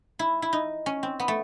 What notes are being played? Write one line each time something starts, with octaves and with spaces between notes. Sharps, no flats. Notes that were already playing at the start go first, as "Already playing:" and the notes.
E4
E4
D#4
C#4
C4
B3
A3